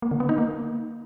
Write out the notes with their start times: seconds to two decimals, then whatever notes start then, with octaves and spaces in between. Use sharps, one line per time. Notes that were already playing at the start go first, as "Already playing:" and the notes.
0.02 A#3
0.11 D3
0.20 B3
0.29 D#4
0.38 A#3